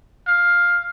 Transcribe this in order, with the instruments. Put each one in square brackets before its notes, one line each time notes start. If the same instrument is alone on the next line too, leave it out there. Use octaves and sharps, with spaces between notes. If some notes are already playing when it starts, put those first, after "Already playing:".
[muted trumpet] F5